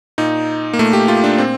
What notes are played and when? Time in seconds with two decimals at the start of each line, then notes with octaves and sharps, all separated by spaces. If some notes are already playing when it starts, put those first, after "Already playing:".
0.18 A#2 D#4
0.73 A#3
0.79 A#2 A3
0.93 G4
1.08 F4
1.24 D4
1.38 A#2 C4